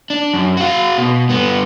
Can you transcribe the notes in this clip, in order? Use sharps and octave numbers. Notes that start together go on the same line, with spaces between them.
D4
F#2
F#4 F5
B2
G2 B3